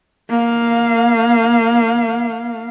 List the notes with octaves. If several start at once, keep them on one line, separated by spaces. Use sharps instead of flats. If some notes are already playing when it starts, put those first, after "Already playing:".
A#3 F5